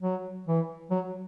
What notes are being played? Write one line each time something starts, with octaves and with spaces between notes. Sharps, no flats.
F#3
E3
F#3